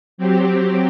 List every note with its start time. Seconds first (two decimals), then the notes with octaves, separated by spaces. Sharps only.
0.18 F#3 C4 G4